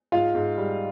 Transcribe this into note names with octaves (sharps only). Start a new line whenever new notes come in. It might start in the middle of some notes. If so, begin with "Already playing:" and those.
G#2 F4 F5
G#2
G3